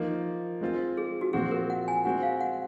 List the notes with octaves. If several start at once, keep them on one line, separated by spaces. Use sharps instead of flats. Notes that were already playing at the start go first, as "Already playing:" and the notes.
Already playing: F3 A#3 D#4
G#3 C4 F4
G#4
F#4
A#2 F3 C4 F#4 G#4
A#4
F#5
G#5
G#3 C4 F#4 F#5
F5
F#5